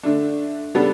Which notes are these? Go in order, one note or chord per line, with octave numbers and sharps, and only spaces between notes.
D3 A3 D4
C#3 G3 B3 D4 A4